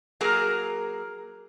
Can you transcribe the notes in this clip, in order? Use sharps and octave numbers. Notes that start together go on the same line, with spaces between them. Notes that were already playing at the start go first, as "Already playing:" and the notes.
F#3 A#3 G#4 A#4 A#5